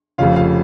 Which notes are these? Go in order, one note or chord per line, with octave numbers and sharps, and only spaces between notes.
F1 F2 C#3 F4 F5
F4 F5